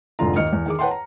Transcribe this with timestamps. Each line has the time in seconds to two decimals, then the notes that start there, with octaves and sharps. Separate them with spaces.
0.19 F1 G#2 D3 F4 A#5
0.36 D#2 D#5 F6 C#7
0.53 E2
0.66 D#3 G#4 D6
0.79 B4 C#5 F#5 G5 A5 C6
0.91 A#5